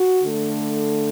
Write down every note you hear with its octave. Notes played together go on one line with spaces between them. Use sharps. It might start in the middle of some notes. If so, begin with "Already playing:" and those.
Already playing: F#4
D3 A3